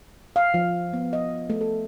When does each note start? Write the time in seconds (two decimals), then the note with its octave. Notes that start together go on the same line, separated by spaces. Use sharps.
0.36 F5
0.54 F3
0.93 B3
1.13 D#5
1.50 A3
1.61 A4